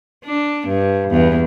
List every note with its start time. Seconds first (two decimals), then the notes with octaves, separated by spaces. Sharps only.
0.25 D4
0.68 G2
1.10 E2